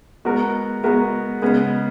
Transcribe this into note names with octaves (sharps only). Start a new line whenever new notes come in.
G#3 B3 F#4 A#4
G#3 B3 F#4 A#4
C#3 G#3 B3